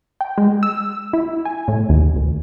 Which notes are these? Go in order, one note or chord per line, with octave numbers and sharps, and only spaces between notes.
G5
G#3
E6
E4
G#5
A2
D#2
D2